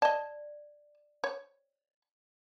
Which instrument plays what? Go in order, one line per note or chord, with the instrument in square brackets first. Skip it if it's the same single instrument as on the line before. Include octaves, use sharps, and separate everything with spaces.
[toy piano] D5 [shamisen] D#5 A5
[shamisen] C#5